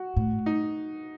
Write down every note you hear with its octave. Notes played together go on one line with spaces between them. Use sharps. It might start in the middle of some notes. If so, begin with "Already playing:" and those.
Already playing: F#4
A2
D#4